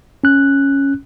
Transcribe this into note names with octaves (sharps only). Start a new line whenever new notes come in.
C#4 F#6